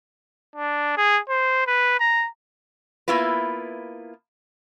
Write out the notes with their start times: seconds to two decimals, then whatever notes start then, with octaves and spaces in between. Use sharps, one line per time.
0.56 D4
0.97 G#4
1.29 C5
1.67 B4
2.00 A#5
3.08 A#3 B3 E4 F4 B4